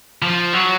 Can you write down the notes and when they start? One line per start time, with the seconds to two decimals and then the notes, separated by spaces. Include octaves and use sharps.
0.22 F3
0.53 F#3